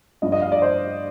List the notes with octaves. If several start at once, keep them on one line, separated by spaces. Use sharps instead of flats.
G2 F3 D#5
D#5
F5
D5
C5